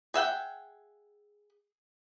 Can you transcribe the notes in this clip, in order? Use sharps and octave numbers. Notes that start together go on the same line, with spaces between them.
G#4 E5 F#5 G5